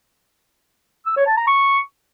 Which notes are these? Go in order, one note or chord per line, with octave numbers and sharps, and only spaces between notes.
E6
C#5
A5
A#5
C#6